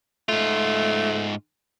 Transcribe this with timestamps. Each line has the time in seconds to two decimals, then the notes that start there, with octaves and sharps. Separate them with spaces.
0.29 G#2 A3 F4